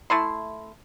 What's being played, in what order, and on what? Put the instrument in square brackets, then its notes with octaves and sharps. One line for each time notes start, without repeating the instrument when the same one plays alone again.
[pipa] A3 E4 C6